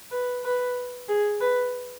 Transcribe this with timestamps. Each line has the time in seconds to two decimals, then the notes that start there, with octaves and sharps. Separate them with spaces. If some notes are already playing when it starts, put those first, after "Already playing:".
0.11 B4
0.44 B4
1.08 G#4
1.41 B4